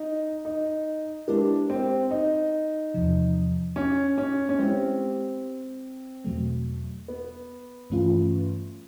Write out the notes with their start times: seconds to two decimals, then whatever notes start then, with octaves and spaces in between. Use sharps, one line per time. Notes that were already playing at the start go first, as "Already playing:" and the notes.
Already playing: D#4
0.45 D#4
1.28 G#3 B3 D4 E4 G4 A#4
1.70 C4
2.11 D#4
2.94 E2 C3 F3
3.76 C#4
4.18 C#4
4.49 C#4
4.59 G#3 B3 C4 E4 G4
6.25 E2 B2 F#3 A3
7.08 B3
7.90 G2 E3 A3 C#4 F4